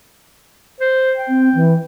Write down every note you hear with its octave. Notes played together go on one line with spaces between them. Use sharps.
C5
G5
C4
E3